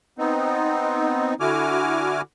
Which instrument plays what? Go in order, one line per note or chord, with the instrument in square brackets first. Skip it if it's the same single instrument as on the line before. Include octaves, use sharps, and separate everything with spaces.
[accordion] B3 C4 D#4
D3 E4 F#4 G#5 D6 F6